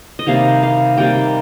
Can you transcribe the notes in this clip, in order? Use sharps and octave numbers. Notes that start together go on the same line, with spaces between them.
D#5
C3 D#3 G3 A#3 F5
F5
C3 D#3 G3 A#3 G5